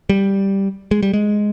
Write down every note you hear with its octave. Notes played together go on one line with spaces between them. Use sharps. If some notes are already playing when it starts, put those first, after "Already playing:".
G3
G#3
G3
G#3